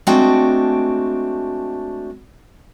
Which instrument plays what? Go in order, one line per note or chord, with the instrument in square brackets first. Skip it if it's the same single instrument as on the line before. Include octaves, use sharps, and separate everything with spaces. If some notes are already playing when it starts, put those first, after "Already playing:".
[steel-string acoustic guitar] G#3 A3 C4 D4 F#4 G5